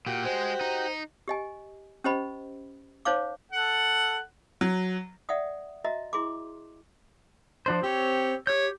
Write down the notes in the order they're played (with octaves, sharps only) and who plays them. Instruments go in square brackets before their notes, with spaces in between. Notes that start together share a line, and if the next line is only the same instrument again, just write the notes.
[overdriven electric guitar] A#2 [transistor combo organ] F#4 G4
[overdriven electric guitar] G#3 [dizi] C5
[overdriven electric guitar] D#4
[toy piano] G4 D#5 G#5
C#4 G4 C5 D#5 B5
D#4 C5 C#5 F5 D6
[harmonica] A4 F#5
[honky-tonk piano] F#3
[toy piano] D5 E5 F#5 G5 D#6
F#4 D#5 E5 A#5
E4 G#4 C6 D6
[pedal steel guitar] F3 D4 C5
[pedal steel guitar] C4 C#5 [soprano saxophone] G4
[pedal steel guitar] G4 G6 [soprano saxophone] C#5